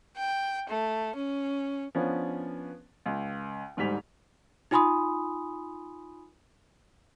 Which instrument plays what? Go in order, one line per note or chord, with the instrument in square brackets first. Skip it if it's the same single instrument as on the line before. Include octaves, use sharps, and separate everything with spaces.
[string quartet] G5
A3
C#4
[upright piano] F3 B3 C#4 D4 B4
C#2
D2 G#2 G3 B6 F7
[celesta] D#4 F4 G#5 B5 C6 D#6